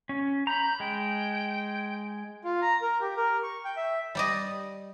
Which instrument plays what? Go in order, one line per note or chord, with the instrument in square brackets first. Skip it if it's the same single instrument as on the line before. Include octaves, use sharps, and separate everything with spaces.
[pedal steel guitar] C#4
[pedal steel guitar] A#5 B5 [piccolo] G6
[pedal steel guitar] G#3 [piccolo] G5
[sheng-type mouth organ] F4
A#5
A#4
G4
A#4
C#6
G5
E5
[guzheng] G3 D5 D#5